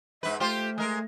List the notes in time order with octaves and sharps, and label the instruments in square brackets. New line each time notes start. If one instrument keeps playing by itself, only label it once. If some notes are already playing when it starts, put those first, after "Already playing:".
[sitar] G#2 B4 [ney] E5
[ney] A3 [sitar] F4 G4 C5
[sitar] G#3 A#4